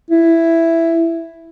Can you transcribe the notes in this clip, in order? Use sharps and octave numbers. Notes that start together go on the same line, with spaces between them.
E4